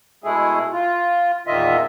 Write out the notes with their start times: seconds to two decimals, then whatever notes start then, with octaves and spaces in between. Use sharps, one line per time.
0.24 B2 G#3 A3 E4 G#4
0.73 F4
1.47 E2 A#2 D#3 F4 D#5 E5